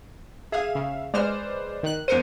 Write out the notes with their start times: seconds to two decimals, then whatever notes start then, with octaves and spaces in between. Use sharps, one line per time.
0.52 G#4 E5 F5
0.75 C#3
1.14 G#3 B4 C5 D5 F6
1.83 D#3 F#6
2.08 E2 A#4 C5 C#7 D#7